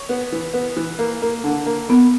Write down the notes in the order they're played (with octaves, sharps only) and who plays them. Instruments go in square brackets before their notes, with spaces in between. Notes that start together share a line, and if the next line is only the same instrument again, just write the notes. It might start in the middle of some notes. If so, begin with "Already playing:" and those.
Already playing: [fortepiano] C#5
B3
E3
B3
E3
A#3
A#3
D3
A#3
[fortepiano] A#3 [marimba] B3